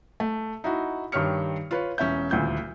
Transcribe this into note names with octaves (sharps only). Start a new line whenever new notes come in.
A3
D#4 E4 F#4
G2 D#3 G4 C#5 F6 C#7
F4 B4 C#5
E1 C#4 E5 G6
D#1 D2 A#2 E3 G6